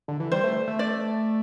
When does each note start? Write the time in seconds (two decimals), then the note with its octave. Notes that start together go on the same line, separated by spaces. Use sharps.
0.08 D3
0.20 E3
0.32 G3 C5
0.44 A3
0.68 A3
0.79 D5